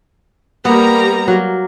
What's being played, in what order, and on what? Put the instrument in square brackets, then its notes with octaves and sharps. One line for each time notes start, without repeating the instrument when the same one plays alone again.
[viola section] G3 A#3 A#5 [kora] B3
[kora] F#3 A#3